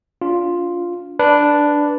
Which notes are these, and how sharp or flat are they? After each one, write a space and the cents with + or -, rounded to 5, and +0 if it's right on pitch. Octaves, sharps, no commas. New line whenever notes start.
D4 -30 F4 +0
D4 +0 B4 +0